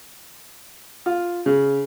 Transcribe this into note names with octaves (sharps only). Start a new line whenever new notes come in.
F4
C#3